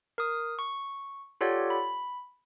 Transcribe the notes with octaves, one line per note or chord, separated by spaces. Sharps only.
A#4 D#6
C#6
F4 G4 A4 C#5 D5 F#5
B5